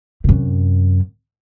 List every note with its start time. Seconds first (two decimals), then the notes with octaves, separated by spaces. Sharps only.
0.24 F#2 C3